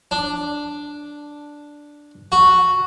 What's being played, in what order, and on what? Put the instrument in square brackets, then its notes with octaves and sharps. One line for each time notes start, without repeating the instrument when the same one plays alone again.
[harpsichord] D4
F#4